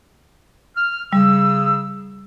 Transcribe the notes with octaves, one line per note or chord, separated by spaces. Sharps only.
F6
C#3 G3 E6